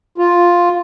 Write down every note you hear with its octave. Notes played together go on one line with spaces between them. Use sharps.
F4